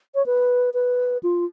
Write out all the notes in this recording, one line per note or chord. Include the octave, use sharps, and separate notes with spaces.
C#5
B4
B4
F4